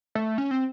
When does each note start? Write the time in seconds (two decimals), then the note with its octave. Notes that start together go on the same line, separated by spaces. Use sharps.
0.15 A3
0.38 C#4
0.51 C4